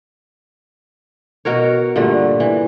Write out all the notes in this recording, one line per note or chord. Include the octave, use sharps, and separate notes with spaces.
B2 F#4 A#4 C#5
G2 A#2 D3 A3
E3